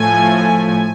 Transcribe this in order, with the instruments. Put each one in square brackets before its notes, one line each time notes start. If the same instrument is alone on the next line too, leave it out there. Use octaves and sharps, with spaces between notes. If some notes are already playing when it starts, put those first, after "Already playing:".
Already playing: [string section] A2 F3 A3 G#5